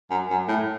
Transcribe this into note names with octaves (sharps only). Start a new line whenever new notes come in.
F#2
F#2
A2